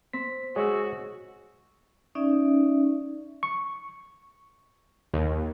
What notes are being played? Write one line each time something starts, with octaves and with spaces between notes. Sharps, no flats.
C4 B6
G#3 F#4 G#4 C#5 C#6 E6
C#4 D#4 D5 E5
C#6
D#2